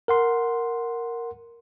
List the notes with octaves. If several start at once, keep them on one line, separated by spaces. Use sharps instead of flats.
A#4 F#5 C6